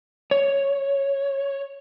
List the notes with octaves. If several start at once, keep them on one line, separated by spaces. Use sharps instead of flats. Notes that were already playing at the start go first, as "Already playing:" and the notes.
C#5